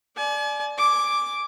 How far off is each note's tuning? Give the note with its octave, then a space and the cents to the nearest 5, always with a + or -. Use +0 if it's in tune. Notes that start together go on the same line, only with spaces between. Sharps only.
D5 +0 G#5 +45
G#5 +0 D6 +0